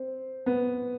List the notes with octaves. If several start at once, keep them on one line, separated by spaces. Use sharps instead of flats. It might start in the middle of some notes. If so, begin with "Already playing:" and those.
Already playing: C4
B3